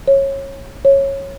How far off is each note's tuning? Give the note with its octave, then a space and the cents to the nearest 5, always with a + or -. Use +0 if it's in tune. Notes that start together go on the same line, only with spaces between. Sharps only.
C#5 -20
C#5 -15